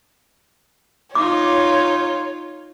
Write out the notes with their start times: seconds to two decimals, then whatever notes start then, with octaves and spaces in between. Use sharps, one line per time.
1.15 D#4 F4 C#5 D6